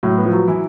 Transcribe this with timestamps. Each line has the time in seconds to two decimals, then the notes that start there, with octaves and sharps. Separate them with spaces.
0.03 A2 F#3
0.18 B3
0.26 F3
0.33 F#3
0.48 E3 E4